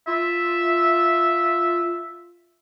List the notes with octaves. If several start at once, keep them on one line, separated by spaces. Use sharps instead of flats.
F4 E5